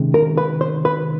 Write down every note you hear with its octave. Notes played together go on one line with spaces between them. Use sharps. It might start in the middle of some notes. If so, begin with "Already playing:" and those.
Already playing: C3 D#3 G#3 C#4
A#4
B4
C5
B4